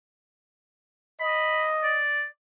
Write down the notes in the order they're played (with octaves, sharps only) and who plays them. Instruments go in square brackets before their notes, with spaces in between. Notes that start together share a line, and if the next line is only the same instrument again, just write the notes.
[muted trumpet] D#5 [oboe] B5
[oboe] D5